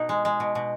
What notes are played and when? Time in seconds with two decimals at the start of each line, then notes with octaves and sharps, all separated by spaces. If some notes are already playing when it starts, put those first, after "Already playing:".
Already playing: B2 D#4
0.09 G#3
0.25 G#3
0.40 B2
0.55 B2